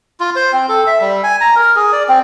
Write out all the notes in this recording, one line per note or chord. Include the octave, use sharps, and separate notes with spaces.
F4
C5
C4
A4
E5
G3
G#5
A#5
A#4
G#4
D5
C4